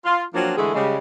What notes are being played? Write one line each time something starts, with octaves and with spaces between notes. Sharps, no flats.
F4
F3 F#3 A#3 C4 D4 F4
D3 E3 G#3 A3 G#4 A4
C#3 G3 G#3